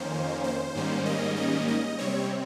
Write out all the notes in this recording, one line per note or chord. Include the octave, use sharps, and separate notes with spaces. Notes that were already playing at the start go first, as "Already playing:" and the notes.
Already playing: F2 D#3 A#3 C#4 C5
C5
G#2 D#3 G3 A#3 C#4
D#5
D#5
D#5
C3 G3 C4 C#5